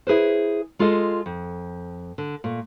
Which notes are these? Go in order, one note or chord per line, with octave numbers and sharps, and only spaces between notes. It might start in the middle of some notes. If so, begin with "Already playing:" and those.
E4 G#4 B4 C5
G#3 F4 G#4 A4 D#5
F2
D3
A#2 A3